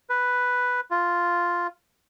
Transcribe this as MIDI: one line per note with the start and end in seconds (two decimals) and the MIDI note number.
0.10 0.81 71
0.91 1.67 65